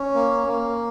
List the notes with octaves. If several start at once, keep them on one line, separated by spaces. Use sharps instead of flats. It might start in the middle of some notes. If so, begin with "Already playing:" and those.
Already playing: C#4
A#3
A#3